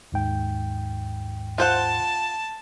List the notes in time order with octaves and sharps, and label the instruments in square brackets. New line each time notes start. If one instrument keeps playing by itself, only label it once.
[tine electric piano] D#2 G#2 G5
[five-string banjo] F4 C5 F#5 [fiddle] A5